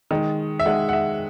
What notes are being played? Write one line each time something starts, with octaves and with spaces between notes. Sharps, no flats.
D#3 G#3
E5
D#3 G#3 F#5
F#5
E5